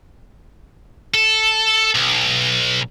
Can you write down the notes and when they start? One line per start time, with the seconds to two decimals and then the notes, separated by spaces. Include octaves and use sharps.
1.14 A4
1.95 B1